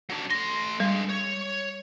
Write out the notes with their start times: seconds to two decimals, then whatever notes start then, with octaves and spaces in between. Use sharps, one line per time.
0.10 F#3 D4
0.30 A3 C6 A#6
0.80 D3 G3 G#3
1.10 C#5